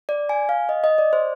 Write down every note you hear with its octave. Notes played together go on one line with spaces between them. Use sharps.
D5
G#5
F5
D#5
D#5
D5
C5